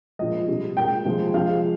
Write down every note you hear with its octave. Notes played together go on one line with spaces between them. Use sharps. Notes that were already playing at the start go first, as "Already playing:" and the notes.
A#2 F3 G#3 D#5
C3 G3
A#2 G#3 G5
C3 F3 G#3
C3 F3 G#3 F5